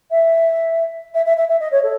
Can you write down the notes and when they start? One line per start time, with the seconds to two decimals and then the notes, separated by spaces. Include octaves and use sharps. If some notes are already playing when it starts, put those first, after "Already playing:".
0.11 E5
1.14 E5
1.26 E5
1.37 E5
1.48 E5
1.60 D#5
1.72 C#5
1.83 A4